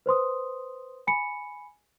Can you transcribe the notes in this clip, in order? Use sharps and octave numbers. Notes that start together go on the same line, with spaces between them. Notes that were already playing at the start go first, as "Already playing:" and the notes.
B4 C5 C6 D#6
G#5 B5 C#7